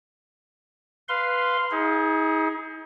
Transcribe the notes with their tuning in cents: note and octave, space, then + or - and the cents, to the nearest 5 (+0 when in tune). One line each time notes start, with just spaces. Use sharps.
B4 +0 F5 +0 C6 -10
D#4 +40 G#4 +0